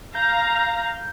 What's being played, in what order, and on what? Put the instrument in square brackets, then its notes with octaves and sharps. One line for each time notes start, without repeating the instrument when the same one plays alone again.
[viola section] F5 A#5 [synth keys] G6